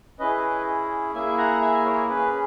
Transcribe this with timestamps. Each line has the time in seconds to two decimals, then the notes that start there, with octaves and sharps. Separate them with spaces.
0.19 C#4 E4 G#4 B4 D#5
1.14 A#3 E4 G#4 E5 G#5
1.38 F#5 A#5
1.61 E5 G#5
1.85 A#4 C#5
2.09 C#4 G#4 B4